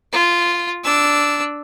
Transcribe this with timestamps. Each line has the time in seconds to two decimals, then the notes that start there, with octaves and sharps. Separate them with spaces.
0.13 F4
0.84 D4 E6